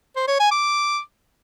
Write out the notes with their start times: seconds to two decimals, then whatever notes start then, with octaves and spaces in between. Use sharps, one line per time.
0.16 C5
0.28 C#5
0.40 G#5
0.51 D6